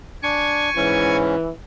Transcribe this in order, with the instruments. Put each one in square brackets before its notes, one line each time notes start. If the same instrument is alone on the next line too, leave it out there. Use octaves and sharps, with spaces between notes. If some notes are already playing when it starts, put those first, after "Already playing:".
[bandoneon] D4 [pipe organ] G#5 C#6
[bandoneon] G#2 C#4 [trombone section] E3